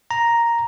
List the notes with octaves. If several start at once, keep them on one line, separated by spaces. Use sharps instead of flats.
A#5